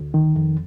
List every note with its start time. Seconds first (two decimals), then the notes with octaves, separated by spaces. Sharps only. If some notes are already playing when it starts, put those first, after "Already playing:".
Already playing: D2
0.14 D#3
0.36 F2